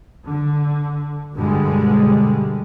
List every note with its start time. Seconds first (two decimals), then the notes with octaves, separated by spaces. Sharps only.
0.25 D3
1.35 G2 B2 D3 G3 G#3